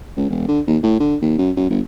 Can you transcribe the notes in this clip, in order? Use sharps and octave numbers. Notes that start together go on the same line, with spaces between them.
C#2
E1
D3
D#2
A2
D3
D#2
F#2
F#2
G1